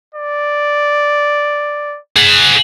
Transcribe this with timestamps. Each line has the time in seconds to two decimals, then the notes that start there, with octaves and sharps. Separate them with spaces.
0.14 D5
2.16 G#4 F#5